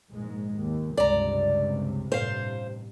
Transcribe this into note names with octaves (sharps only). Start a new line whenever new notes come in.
A#1 G#2 G#3
D#2
C#2 G2 C3 D5 A#5
A1 G2 C3 C5 F5